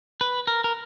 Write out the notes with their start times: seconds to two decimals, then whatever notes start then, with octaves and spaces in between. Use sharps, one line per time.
0.21 B4
0.47 A#4
0.64 A#4